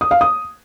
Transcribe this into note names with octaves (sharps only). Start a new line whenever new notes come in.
D#6
F5
D#6